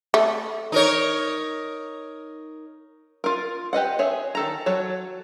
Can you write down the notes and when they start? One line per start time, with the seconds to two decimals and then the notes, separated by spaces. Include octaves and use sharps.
0.14 A3
0.72 D#4 A#4 C#5
3.24 F4 A#4
3.73 G4 B4 D#5 F#5
3.99 G#4 C#5 E5
4.35 D#3 A4 A#5
4.66 F#3 A4 C#5